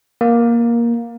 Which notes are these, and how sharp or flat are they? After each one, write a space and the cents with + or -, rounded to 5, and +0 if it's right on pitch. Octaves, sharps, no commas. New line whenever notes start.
A#3 +10